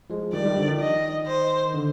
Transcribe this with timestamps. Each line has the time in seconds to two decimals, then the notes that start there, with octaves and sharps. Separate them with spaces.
0.10 F3 G#3
0.33 D#3 G3 D5
0.45 D#3 G3
0.57 D3 F3
0.68 D#3
0.80 D#5
1.27 C5
1.74 D3